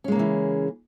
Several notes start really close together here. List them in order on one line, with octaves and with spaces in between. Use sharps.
C#4 G#3 A#3 C#3 E3